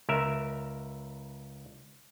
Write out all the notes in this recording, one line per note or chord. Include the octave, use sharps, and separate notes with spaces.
C#2 A#4 E5